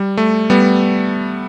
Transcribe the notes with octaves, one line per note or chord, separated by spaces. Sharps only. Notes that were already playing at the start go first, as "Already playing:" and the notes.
Already playing: G3
A3
G3 B3